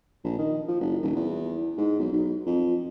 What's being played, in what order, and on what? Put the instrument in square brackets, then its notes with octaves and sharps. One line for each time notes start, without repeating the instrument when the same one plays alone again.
[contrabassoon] A#1
D#3
F3
F#1
D#1
E2
G#2
B1
B1
F2